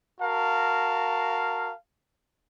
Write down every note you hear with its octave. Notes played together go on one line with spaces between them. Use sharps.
F#4 A#4 F5 A5